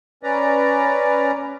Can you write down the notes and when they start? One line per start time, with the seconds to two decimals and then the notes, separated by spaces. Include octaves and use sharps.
0.23 C#4 B4 D5 A#5